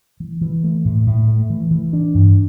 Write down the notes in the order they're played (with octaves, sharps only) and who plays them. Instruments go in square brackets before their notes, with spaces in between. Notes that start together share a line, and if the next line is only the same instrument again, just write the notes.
[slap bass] E3
E3
A3
A2
A2
A3
E3
E3
D4
G2